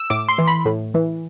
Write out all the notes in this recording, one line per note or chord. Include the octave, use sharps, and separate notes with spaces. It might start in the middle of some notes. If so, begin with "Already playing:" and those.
Already playing: E6
A2 D6
C6
E3
B5
A2
E3